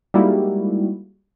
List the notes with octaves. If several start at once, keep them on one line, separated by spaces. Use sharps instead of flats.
G3 G#3 A#3 D#4 E4 F#4